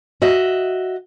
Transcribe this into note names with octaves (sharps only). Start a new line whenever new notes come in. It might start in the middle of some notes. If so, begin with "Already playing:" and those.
F#4 D#5 E5